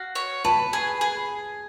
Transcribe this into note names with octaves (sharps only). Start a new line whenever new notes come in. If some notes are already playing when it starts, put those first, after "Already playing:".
Already playing: F#4 F5
C#5
B4 A5
G#4
G#4